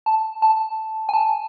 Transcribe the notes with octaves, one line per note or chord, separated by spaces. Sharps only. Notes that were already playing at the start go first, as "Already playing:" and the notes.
A5
A5
G#5
A5